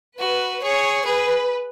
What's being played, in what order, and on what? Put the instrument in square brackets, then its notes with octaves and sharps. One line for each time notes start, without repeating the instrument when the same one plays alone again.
[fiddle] F#4 [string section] B4
[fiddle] G#4 [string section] C#5
[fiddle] G#4 [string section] B4